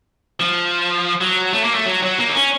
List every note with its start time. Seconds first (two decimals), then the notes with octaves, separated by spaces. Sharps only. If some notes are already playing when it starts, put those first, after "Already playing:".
0.40 F3
1.21 F#3
1.53 A3
1.64 A#3
1.74 A3
1.85 F#3
2.02 F#3
2.18 A#3
2.28 D#4
2.34 C#4